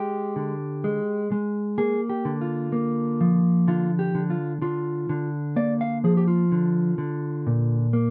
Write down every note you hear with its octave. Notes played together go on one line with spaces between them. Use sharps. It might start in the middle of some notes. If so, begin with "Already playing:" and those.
Already playing: G#3 G4
D3
G#3
G#3
A#3 G#4
G4
D3
F4
A#3
F3
D3 F4
G4
D3
F4
D3 F4
D3
A#3 D5
F5
F3 G#4
G4
F4
D3
D3
A#2
A#3